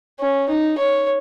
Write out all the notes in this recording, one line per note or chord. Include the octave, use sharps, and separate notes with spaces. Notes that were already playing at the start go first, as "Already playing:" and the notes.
C#4
D#4
C#5